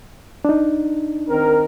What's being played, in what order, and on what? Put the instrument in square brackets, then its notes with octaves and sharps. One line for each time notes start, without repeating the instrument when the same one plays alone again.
[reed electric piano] D4 D#4
[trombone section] D#3 C4 A#4